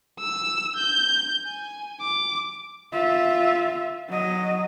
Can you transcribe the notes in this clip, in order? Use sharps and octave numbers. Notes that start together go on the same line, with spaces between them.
E6
G6
G#5
D6
F4 E5
F#3 D#5